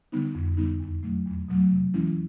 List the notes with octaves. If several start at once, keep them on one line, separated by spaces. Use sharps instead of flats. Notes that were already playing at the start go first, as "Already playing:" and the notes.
D3 G3 B3 D#4
F2
D3 G3 B3 D#4
E2
B2 F#3 A3
E2
B2 F#3 A3
C3
E3 G#3 C#4 E4